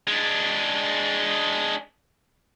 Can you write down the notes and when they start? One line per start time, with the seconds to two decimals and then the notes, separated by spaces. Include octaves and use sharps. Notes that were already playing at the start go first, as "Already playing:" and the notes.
0.07 G#3 D4